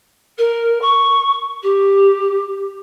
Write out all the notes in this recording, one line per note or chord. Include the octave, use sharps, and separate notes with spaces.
A#4
C#6
G4